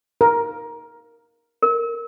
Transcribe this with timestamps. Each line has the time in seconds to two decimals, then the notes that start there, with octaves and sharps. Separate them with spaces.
0.21 A#4
1.62 A#4